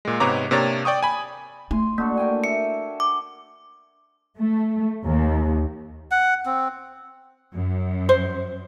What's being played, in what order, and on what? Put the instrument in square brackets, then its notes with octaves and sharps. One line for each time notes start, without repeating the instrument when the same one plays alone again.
[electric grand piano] A#2 G#3
G#2 C3 B3 C#5 A#5 D6
C3 A#3 D4 C#5 A#5 A6
D5 G5 C#6 D#6
G#5 B5
[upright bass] A3 E4 [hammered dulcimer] G#5 C6
[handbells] A#3 [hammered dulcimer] D4 F#4 A4
[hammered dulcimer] A#4 G5 G#5
[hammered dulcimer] E5 [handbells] C#7
[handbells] D6
[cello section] A3
D#2
[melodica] F#5
C4
[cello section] F#2
[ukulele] C5